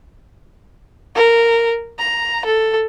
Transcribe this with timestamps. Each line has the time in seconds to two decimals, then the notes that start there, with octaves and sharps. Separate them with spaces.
1.16 A#4
1.99 A#5
2.45 A4